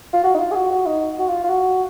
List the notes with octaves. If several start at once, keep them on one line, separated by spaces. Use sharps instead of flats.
F4
F#4
D#4
F4
G#4
F#4
F#4
D#4
F#4
F4
F4
F#4